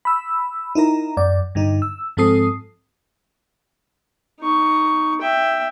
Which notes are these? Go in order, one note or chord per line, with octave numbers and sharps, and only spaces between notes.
B5 E6
D#4 E4 A#4 A#5
F#2 D5
G2 D3 D#4
E6
G#2 F3 C4 A4 D#6 C7
D#4 C#6
E5 G5